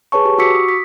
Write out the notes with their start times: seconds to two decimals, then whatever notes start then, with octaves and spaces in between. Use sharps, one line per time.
0.12 G#4 B4 C#5 A5 C#6
0.25 G4
0.38 F#4 C#6 D6 E6 B6 C#7
0.54 D#6
0.69 B6